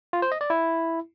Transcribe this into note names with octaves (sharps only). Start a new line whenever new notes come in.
F4
C5
D#5
D5
E4